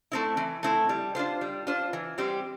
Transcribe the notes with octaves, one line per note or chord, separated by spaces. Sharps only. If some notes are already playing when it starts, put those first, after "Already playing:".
A3 C4 E4
E3
A3 C4 E4
G3
D4 F4 C5
G3
D4 F4 C5
E3
G3 C4 G4 C5